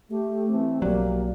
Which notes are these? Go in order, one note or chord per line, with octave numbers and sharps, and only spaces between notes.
A3 G4
E3 A3 C4
B1 F3 F#3 A#3 G4 D5